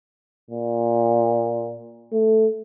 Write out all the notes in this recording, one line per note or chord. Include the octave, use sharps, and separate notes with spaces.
A#2
A3